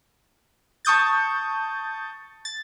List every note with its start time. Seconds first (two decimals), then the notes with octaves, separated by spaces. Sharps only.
0.85 A5 C#6 D#6 G6 A6
2.45 A6